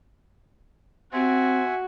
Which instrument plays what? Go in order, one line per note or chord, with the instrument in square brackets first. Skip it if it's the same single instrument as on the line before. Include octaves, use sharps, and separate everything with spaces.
[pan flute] C4 [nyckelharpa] F#4 [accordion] C5 [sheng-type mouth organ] E5 F#5 G#5